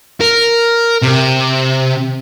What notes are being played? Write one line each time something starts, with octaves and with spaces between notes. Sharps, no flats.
A#4
C3